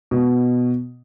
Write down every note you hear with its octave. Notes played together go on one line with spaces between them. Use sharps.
B2